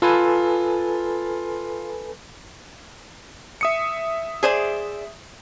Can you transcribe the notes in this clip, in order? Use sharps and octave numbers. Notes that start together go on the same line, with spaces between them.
F4 A4 B4 G#5
E5 D#6 C#7
G#4 C5 D5